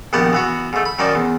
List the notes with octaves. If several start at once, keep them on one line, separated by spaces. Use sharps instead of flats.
A#1 D#3 B3 G4 F#5 A5
E3 B3 F#4
G#2 A3
B5
F#2 D#3 D#4 D5 A5
E2